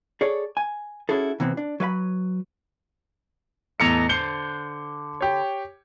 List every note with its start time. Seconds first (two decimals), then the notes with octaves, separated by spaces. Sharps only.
0.21 G#4 A4 C#5 D5
0.57 G#5
1.09 C#4 E4 F#4 G#4 A4
1.40 C3 E3 B3 C4
1.57 D4
1.80 F#3 B4 F5 B5
3.80 E2 A2 A4 D#5 A#5 C#7
4.09 D3 C5 C#7 G7
5.21 G4 C#5